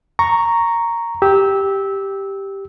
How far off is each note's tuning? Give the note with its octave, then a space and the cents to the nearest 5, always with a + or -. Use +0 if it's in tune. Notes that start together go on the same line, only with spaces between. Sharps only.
A#5 +0 C#6 +0
G4 +0 E6 -20